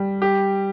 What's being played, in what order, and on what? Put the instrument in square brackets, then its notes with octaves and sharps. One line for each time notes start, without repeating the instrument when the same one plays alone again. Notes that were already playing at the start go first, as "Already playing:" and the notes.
Already playing: [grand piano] G3
G4